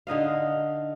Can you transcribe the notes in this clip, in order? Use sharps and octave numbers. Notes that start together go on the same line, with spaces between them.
D3 D#4 D#5 F5